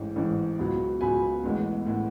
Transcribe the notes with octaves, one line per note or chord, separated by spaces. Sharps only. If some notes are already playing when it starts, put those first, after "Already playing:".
Already playing: A1 G#2 E3
A1 G#2 E3
C#2 B2 F#3
C#2 B2 F#3 G#5 B5
A1 A2 G#3 B3
A2 G#3 B3